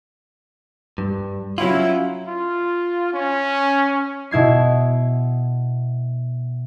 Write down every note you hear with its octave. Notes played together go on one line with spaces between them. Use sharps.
G2
F#3 C#4 E4 F4 F#7
F4
C#4
B2 E4 G#6 C7